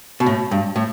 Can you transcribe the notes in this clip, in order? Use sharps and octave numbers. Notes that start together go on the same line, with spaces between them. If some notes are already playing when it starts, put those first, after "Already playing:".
B2
A2
G2
A2